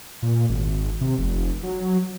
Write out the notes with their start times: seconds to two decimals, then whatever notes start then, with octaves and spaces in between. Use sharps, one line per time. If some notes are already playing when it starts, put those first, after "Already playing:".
0.22 A#2
0.50 G#1
1.01 C3
1.19 F1
1.63 F#3